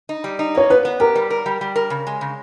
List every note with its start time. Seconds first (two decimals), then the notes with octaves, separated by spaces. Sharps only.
0.09 D#4
0.24 G3
0.39 D#4
0.55 A#3 C#5
0.70 B3 B4
0.85 B3
1.00 G4 A#4
1.16 G3
1.30 A#4
1.46 G3
1.61 G3
1.76 A#4
1.90 C#3
2.07 G#3
2.21 C#3